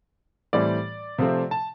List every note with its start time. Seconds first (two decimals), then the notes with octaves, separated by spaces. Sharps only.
0.53 A2 E3 G3 C4 D5
1.18 C3 F3 A3 C4
1.51 A5